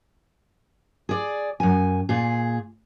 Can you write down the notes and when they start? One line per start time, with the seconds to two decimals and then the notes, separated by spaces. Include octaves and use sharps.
1.09 G#4 D5
1.60 F#2 G#5
2.09 A#2 G#4